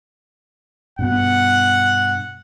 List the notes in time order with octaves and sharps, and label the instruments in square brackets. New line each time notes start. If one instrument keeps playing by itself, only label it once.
[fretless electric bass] G2 B2 B3 [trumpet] F#5